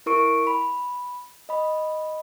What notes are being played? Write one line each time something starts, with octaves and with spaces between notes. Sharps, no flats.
E4 A#4 C#6 D7
B5
D#5 B5